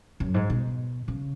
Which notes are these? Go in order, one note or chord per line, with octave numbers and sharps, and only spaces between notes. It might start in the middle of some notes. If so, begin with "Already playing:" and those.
F#2
G#2
B2
C#3